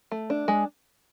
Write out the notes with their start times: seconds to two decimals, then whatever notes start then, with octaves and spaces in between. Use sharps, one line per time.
0.12 A3
0.30 D4
0.48 G#3